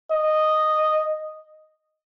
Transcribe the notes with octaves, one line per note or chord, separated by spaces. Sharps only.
D#5